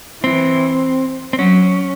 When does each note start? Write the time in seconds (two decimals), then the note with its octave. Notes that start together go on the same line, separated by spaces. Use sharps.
0.23 E3 C4
1.33 C4
1.39 F#3 C#4